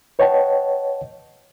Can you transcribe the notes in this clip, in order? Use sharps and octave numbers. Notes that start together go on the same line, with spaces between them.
B4 C#5 D#5 F#5 G5 A5